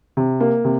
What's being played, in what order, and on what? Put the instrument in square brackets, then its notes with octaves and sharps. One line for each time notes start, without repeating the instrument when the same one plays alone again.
[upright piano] C3
A#3
C3